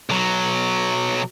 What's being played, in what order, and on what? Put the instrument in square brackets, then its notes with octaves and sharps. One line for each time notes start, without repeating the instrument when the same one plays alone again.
[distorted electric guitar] B1 F#3